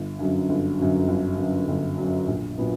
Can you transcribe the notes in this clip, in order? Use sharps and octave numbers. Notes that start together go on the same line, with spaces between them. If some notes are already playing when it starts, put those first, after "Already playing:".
Already playing: G1
F#2 D3 F#3
G1
F#2 D3 F#3
G1
F#2 D3 F#3
G1
F#2 D3 F#3
A#1
A#2 F#3 B3 D4